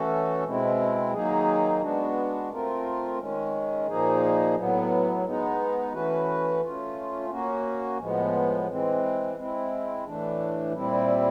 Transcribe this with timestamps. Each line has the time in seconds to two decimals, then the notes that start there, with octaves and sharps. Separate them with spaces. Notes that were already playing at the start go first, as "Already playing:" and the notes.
Already playing: E3 A3 C#4 F#4 A4
0.44 B2 G#3 C4 E4
1.12 D#3 F#3 A#3 D#4 G#4
1.81 G#3 B3 D4 F#4
2.50 A3 C4 F4 A#4
3.19 D#3 G#3 C#4
3.87 A#2 F3 A#3 D#4 G#4
4.56 A2 F#3 B3
5.25 G#3 B3 D#4
5.92 E3 A3 C#4 F#4 B4
6.61 A3 C#4 F4
7.30 A#3 C#4 F#4
7.99 A2 F3 G#3 B3
8.67 E3 G#3 C4
9.35 G#3 C4 E4
10.05 A2 E3 A3 D4
10.72 A#2 G3 C4 E4